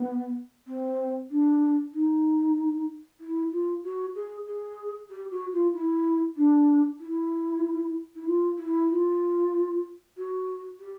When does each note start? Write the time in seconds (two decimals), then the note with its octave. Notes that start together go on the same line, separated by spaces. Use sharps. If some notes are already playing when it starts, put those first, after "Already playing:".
Already playing: B3
0.67 C4
1.30 D4
1.94 D#4
3.20 E4
3.52 F4
3.84 F#4
4.15 G#4
4.47 G#4
5.10 G4
5.31 F#4
5.53 F4
5.73 E4
6.37 D4
7.00 E4
8.16 E4
8.26 F4
8.58 E4
8.91 F4
10.17 F#4
10.80 G4